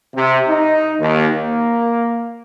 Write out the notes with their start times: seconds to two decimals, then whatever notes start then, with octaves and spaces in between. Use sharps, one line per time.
0.14 C3
0.48 D#4
0.99 D#2
1.33 A#3